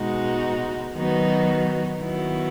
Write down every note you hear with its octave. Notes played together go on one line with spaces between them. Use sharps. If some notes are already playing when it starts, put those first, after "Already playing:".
Already playing: B2 G#3 D#4 F#4
D#3 F#3 B3 D#4 F#4
D#3 F#3 B3 E4